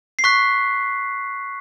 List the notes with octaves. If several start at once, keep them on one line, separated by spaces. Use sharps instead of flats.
C7
C#6 F#6 B6